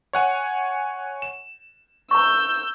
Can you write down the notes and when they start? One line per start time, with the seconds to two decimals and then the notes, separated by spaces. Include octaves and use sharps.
0.13 C#5 F#5 G#5
1.22 E7
2.11 A#5 C#6 E6 G6